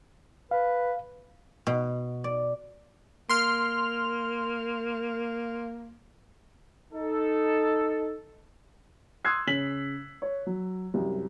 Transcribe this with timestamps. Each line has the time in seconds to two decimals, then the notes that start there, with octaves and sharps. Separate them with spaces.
0.51 B4 F5
1.67 B2
2.24 D5
3.29 A#3 C6 F6
6.93 D#4 A4
9.25 C6 D#6 E6 F#6 G#6 C7
9.47 C#3 C#5 B6 F#7
10.22 C#5
10.46 F#3
10.94 C2 F#2